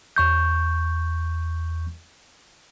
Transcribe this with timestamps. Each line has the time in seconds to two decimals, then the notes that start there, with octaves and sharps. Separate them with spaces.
0.16 E2 C#6 G6